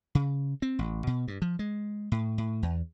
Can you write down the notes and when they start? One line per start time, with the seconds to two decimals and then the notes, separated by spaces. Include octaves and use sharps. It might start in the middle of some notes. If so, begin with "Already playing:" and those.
0.15 C#3
0.62 C4
0.79 A1
1.07 B2
1.28 G2
1.42 F3
1.59 G#3
2.12 A2
2.38 A2
2.63 E2